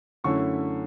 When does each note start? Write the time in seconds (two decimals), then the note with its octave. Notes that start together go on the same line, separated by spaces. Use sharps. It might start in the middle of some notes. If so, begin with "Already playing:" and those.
0.24 F#2 D3 A3 C#4 E4 C#6